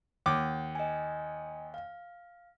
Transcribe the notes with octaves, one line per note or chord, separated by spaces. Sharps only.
D#2 F#5 D6
D#5 G#5
F5